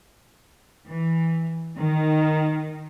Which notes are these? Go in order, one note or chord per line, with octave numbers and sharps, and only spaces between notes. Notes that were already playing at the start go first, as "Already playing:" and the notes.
E3
D#3